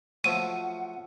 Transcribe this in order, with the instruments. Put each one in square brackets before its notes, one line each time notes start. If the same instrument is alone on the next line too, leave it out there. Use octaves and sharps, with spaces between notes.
[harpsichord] F3 F#3 A3 [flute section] F#5 [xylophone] D#7